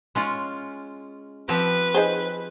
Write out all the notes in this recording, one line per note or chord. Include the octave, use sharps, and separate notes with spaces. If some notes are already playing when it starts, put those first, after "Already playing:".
G#3 C#4 F4
F3 C4 G4 B4
D#4 G#4 C5